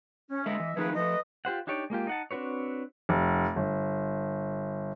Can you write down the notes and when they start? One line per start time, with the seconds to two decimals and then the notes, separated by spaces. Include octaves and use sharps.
0.31 C#4
0.46 D3 G#3 B4 D#5 E5
0.60 E3
0.77 D#3 F3 A3 D#4 G#4 B4
0.96 F3 A3 B4 D#5
1.45 F4 G4 C5 F#5
1.67 D4 D#4 G4 C#5 D5
1.90 G#3 A#3 F4 G4
2.07 D#4 F#5 A5
2.31 C4 D4 F#4 B4 C#5
3.09 F1
3.56 G1